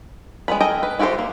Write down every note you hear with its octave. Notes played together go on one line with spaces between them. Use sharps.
G#3 B3 A#4 B5
A4 A#4 D#5 G5 G#5
B4
E4 F#4 G4 A4 C5
A#3